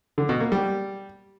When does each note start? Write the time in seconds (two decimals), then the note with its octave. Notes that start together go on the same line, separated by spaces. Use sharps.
0.18 D3
0.29 B2
0.40 A#3
0.52 G3